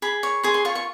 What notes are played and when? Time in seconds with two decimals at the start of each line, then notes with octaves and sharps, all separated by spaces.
0.02 G#4 B5
0.23 C#5
0.43 G#4 C6
0.54 C6
0.65 F4 C#6
0.75 C#6